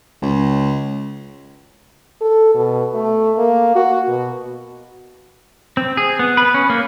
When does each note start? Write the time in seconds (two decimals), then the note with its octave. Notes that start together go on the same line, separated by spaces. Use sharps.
0.22 C#2
2.21 A4
2.55 B2
2.94 A3
3.38 A#3
3.75 F#4
4.08 B2
5.77 C4
5.97 G#4
6.19 B3
6.37 B4
6.54 C#4
6.70 A#3